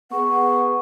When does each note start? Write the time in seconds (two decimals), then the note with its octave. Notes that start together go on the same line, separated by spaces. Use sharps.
0.12 B3 G#4 F#5 C#6